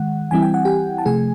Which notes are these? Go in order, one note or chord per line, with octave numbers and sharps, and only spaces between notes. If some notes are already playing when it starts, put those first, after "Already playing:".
Already playing: D#3 G#3 F#5
E3 G3 C4 E4 G#5
G5
F#5
G4 G5
A5
C3 F3 A3 G#4 G#5